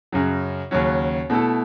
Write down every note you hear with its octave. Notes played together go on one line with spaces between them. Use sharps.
F#2 C#3 F#3
D#2 C#3 F#3 C#4
B2 A3 E4 A4